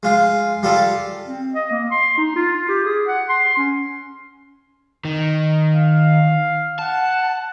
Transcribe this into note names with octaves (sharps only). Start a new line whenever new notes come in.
G#3 F4
G3 F4 A4
C4
D#5
A#3
C6
D#4
F4
G4
G#4
F#5
C6
C#4
D#3
F5
F#5 A5